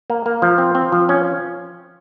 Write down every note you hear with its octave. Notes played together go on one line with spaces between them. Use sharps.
A#3
A#3
F3
C4
C4
F3
C#4